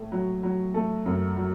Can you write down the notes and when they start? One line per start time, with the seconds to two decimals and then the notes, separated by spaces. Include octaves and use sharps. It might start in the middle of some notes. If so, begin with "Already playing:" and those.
Already playing: A2 A3
0.12 F#3
0.43 F#3
0.74 A3 A4
1.06 F#2
1.36 F#3